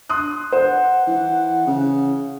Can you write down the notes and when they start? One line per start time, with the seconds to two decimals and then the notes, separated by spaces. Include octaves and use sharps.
0.09 C6 D#6 F#6
0.52 C5 F#5
1.07 E3
1.67 C#3